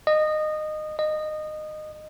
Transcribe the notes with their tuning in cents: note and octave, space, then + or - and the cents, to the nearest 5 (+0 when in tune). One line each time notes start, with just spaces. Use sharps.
D#5 -20
D#5 -20